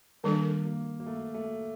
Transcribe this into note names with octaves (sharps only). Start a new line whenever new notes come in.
D#3 G3 A#3 D4 A4
A#3
A#3
A3
A3